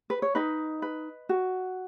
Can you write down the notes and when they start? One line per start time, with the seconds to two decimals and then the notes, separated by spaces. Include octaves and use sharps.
0.10 B4
0.22 C#5
0.35 D#4 B4 D#5
0.82 B4
1.29 F#4